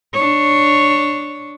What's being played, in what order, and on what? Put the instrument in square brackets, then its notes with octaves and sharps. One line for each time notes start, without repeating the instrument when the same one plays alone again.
[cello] D4 C#5